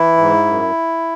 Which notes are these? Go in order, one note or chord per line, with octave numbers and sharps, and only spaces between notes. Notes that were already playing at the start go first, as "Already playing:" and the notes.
Already playing: E3 E4
G#2
F#2